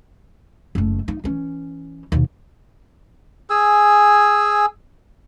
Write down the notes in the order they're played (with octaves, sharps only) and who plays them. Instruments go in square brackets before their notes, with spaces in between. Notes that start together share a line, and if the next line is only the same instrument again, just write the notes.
[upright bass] F#1 A3
D#4
E3 C#4
D#2 B2
[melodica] G#4 G#5 E6